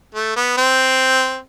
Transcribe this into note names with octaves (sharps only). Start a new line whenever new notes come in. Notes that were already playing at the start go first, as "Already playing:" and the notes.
A3
B3
C4